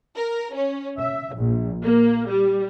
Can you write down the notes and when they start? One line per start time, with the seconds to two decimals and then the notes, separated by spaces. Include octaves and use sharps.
0.15 A#4
0.54 C#4
0.98 E5
1.36 A#1
1.83 A#3
2.28 G3